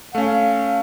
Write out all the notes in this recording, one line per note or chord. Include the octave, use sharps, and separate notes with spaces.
A3 C#4 F5